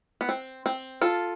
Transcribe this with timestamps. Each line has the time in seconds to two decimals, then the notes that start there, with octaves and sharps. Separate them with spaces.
0.21 B3
0.29 C4
0.66 C4
1.02 F4 A4